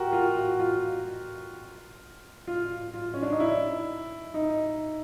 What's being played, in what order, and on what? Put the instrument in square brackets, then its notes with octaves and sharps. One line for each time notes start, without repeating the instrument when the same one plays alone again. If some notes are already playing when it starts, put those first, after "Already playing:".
Already playing: [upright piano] F#4 G4 A#4
F4
F#4
F4
F4
F4
C#4
D4
D#4
E4
D#4